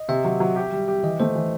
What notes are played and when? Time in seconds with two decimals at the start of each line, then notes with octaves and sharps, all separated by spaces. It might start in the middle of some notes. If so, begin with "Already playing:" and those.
Already playing: D#5
0.09 C3 E5
0.25 F#3
0.40 F#3
0.56 G4
0.72 G3
0.88 G4
1.03 E3 D#5
1.20 A3 C5
1.35 E3